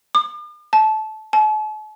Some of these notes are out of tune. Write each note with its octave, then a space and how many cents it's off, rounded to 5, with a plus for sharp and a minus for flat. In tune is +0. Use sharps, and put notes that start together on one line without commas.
D6 +45
A5 -20
A5 -45